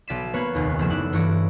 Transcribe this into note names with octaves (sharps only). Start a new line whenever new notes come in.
B1 D5 A6 B6 D#7 E7
A#3 B3 B4 C#5
F1 A#1 D#2
F#1 F3 F#3 A3 A4 E7
E4 D5 F#6
G2 E3 C#5 A#6 D7